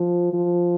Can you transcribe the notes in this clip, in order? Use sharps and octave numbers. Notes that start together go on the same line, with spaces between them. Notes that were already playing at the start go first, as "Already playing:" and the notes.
Already playing: F3
F3